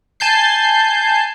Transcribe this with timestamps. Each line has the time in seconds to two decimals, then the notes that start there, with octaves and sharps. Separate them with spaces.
0.20 G#5 A5 G6 C7